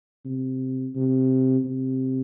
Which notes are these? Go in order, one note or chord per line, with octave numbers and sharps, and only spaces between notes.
C3
C3
C3